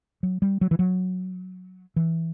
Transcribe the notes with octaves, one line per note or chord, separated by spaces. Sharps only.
F#3
G3
F#3
E3
F#3
E3